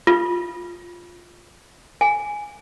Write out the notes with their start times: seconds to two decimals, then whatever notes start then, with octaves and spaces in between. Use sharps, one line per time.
0.07 F4
2.01 G#5